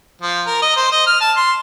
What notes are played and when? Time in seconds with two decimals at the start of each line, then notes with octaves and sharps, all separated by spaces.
0.22 F3
0.47 A#4
0.62 D#5
0.77 C5
0.92 D#5
1.07 F6
1.21 A5
1.37 C6